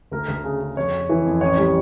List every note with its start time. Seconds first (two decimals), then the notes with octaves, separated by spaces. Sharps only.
0.11 D2 A#4
0.28 D2
0.44 C#3
0.61 C#3
0.77 F2 C#5
0.92 C#3
1.09 E3
1.25 F2
1.41 A1 C#5
1.58 G3